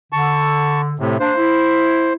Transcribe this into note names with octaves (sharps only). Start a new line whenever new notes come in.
D3 A5 C#6
A2 C3
A#3 D4 C5
E4